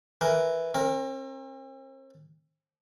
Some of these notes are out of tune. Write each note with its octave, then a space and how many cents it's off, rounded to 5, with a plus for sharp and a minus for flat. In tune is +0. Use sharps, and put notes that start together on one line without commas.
E3 +0 A#4 +0
C4 +45 A#4 +0